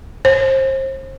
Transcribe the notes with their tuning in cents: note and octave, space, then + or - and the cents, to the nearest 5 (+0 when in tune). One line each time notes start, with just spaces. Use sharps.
C5 +35